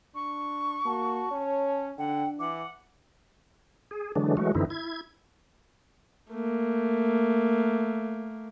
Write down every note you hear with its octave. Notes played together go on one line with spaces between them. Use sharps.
D4 C#6
A#3 F#4 A5
C#4 C#5
D3 D4 F#5 G5
E3 F#5 D6
G#4
D3 E3 F#3 G#3 D4
E3 F#3 G#3 A3 F#4
F#2 D3 E3 C4 D#4 E4
E4 G#6
A3 A#3